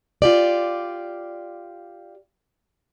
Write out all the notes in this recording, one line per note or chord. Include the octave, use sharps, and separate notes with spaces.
F4 G4 D5